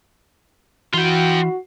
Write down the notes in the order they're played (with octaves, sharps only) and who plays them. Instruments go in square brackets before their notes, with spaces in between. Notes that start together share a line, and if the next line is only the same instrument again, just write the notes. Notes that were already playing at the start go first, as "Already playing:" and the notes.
[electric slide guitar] E3 [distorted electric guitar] F4 G5 [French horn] F#4